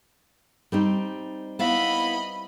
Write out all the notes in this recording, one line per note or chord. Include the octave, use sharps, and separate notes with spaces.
G3 C4 D#4
B3 E4 D#5 F5 B5